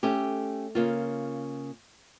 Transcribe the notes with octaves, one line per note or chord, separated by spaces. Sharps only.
A3 C#4 G4
C#3 A#3 F4